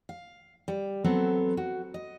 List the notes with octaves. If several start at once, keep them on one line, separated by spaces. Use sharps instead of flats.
F5
G3
F#3 B3 C4 A4
F#4
D#5